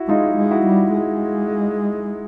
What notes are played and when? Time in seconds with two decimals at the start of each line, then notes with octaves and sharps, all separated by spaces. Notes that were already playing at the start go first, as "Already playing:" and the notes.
Already playing: E4 F#4
0.08 G#3 D#4 F4
0.37 G#3
0.51 E4 F#4
0.67 G3
0.94 G#3